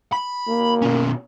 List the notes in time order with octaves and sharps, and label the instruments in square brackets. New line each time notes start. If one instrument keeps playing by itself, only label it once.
[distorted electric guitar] B5
[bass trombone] A#3
[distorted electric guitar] B2 C#4